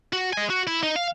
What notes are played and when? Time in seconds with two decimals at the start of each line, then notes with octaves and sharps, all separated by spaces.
0.13 F#4
0.33 D#5 G#5
0.50 F#4
0.67 E4
0.83 D#4
0.96 F5